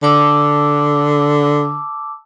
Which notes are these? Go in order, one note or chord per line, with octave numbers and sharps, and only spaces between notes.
D3 A5 D6 E6